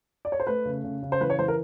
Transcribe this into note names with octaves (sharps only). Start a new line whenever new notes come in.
D5
C#5
C5
A3 B4
C#3
C#3
C#3
C5
E3 B4
C#5
E3 C5
A#4